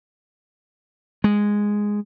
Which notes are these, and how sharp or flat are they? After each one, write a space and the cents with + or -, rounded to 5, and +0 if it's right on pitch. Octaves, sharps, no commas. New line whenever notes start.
G#3 -5